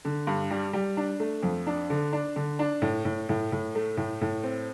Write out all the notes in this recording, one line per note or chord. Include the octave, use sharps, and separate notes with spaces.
D3
G2
G3
G3
D4
A3
F2
D4
D3
D4
D3
D4
A2
A2
A2
A2
A3
A2
A2
C4